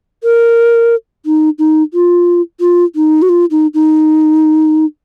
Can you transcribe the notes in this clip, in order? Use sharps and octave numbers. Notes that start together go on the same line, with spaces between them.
A#4
D#4
D#4
F4
F4
D#4
F#4
F4
D#4
D#4